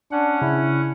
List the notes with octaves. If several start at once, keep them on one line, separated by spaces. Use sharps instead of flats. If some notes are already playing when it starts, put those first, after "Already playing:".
C#4 D4 F#5
C#3 E4